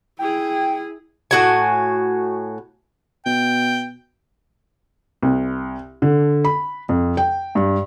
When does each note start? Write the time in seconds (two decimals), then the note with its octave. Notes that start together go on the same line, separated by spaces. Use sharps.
0.19 E4 G#4 G5
1.31 A2 F#4 G#5
3.26 B2 G5
5.23 C2
6.02 D3
6.45 B5
6.89 F2
7.17 G5
7.55 G2